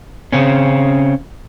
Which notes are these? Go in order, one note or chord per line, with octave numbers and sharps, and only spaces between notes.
C#3 C4 C#4